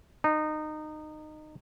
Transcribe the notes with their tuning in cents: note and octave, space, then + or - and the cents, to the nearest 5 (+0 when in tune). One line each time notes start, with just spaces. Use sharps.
D#4 -20